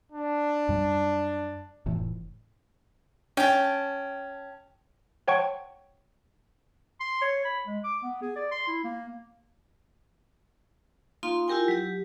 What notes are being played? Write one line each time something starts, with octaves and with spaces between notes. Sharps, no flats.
D4
F#2 G3
F1 A2 E3
C#4 G5 A5
C5 C#5 F#5 G5 A5 C#6
C6
C#5
B5
G#3
D6
B3
G#4
D5
C6
E4
A#3
A#3 D#4 F4 F5 C6
E4 F4 G4 A#4 G5 G#5
F#3 G4